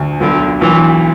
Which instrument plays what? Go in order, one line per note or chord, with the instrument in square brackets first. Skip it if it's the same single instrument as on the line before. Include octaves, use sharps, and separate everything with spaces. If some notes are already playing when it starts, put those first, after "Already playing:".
Already playing: [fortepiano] D2
[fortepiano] B1 [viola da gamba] D3
[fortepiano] B1 [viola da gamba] E3